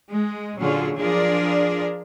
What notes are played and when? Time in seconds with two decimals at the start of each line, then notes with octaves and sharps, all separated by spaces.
0.11 G#3
0.59 A#2 D3 F#3 C#4 F4 G#4
0.96 F3 D4 F4 G#4 A#4 D5